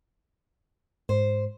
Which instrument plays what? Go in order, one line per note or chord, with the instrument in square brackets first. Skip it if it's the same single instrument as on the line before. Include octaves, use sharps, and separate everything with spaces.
[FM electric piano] G#2 [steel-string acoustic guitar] C5